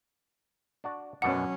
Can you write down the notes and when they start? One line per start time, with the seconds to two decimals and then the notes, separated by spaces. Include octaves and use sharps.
0.84 D4 F#4 D5
1.22 F#2 B2 F#3 C#4 D4 F#5